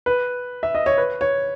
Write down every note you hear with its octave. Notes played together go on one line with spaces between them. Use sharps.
B4
E5
D#5
C#5
B4
C#5